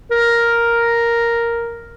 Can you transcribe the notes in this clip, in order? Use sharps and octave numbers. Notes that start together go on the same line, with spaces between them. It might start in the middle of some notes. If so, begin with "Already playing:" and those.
A#4